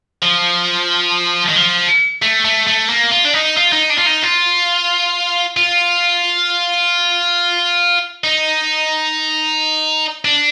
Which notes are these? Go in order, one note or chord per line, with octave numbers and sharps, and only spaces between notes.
F3
D#3
F3
A3
A3
A3
A#3
F4
D4
D#4
F4
D#4
D4
F4
D#4
F4
F4
D#4
D4